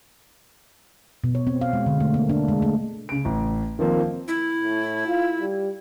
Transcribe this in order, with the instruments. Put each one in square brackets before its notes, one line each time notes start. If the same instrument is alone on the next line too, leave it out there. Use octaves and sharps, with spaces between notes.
[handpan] B2
C#5
C4
F5
G#3
D3
A3
A#3
D4
G#3
A3
[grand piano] C#3 D7
A1
D#3 F3 A#3 C4
[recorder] E4
[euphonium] A2
F4
G3